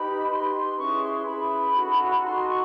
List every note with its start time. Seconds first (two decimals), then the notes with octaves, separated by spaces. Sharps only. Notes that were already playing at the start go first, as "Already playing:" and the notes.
Already playing: D#4 G4 B4 B5
0.29 D#4 G4 B4 C6
0.78 C#4 E4 G#4 B4 C#6
1.02 C6
1.27 C#4 E4 G#4 B4 B5
1.75 D#4 F#4 A4
2.24 D#4 F#4 A4 C6
2.49 C#6